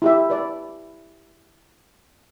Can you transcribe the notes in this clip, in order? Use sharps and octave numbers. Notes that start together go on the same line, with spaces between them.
E4 G4 E5
B4 D5